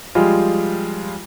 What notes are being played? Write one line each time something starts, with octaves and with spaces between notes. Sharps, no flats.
F3 G3 G#3 F4 G#4